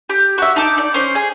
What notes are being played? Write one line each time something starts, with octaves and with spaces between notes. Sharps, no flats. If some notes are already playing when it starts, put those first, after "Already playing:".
G4
F#4 E5
D#4 A5 D6
D5
C#4 C5
G#4